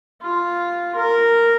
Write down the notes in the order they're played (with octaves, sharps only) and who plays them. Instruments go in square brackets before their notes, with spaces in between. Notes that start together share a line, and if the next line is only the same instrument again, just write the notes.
[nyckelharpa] F4
A#4